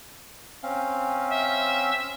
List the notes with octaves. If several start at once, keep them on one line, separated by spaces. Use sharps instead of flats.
C4 C#4 F5
E5